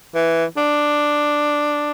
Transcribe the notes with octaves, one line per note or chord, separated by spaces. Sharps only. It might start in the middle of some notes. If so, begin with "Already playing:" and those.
E3
D4